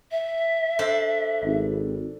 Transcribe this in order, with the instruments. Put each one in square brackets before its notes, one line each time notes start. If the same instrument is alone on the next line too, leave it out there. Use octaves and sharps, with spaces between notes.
[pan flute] E5
[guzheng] D4 A4 C5
[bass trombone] G#1